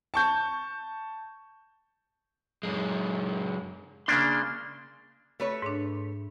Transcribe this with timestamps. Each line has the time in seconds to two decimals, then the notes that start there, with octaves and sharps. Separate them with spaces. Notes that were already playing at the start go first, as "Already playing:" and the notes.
0.14 A5 C#6 G6
2.63 F#2 G#3
4.08 C#3 A#3 D4 C6
5.40 A3 B4 C#5
5.62 G#2 D4